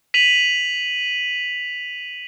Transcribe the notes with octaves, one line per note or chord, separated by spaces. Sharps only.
B6 D#7 F7 F#7